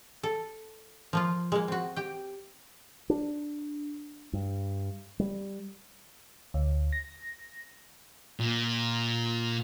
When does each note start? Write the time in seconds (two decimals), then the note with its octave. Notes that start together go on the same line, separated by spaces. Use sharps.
0.23 A4
1.13 F3 A#3 F4
1.52 G#3 A#3
1.68 C4 F#4
1.96 G4 G5
3.10 D4
4.33 G2
5.19 G3
6.54 D2
6.92 A#6
8.40 A#2